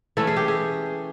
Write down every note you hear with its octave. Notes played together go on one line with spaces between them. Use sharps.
E3 A3 C#4 A4
G#4
G4
G#4